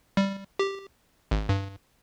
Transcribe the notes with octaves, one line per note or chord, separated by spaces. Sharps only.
G3
G4
G#1
G2